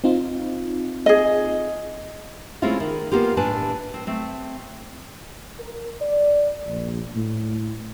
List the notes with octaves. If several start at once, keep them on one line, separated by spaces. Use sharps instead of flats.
C4 D#4 F4
G#4 D#5
G#3 A3 C4 C#4 E4 F4
D#3
A#3 B3 F4 G4
A2 D4 B4 G#5 A5
C4
A3 C4
A#4
D5
A#1
A2